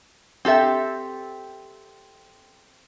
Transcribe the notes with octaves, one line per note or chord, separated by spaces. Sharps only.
C4 G4 A4 E5